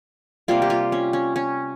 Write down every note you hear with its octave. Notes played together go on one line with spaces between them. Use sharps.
C3 G3 A#3 F4
G4
F4
C#4
C#4
C#4